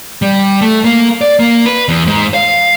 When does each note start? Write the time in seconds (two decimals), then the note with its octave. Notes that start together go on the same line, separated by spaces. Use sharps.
0.22 G3
0.61 A3
0.84 A#3
1.21 D5
1.39 A#3
1.66 B4
1.88 E2
2.07 G#2
2.34 F5